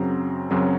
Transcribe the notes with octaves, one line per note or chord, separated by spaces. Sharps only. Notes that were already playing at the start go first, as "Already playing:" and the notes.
Already playing: F#2 C#3 F#3 C4 A#5
F#2 C#3 F#3 C4